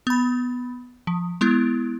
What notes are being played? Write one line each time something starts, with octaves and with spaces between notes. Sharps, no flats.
B3 B5
F3
G#3 B3 E4